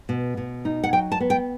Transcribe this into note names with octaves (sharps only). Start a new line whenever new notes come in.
B2
B2
D#4
F#5
F#3 G5
A5
B3
G5